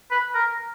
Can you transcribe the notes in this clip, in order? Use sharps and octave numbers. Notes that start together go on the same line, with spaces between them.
B4
A#4